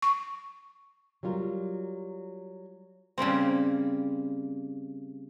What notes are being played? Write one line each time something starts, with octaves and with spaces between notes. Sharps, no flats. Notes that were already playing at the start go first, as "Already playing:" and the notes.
C#6
F#3 G3 F4 A#4
C#3 G3 A#3 C4